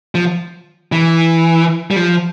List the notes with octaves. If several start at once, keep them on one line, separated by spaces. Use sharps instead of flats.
F3
E3
G3
F3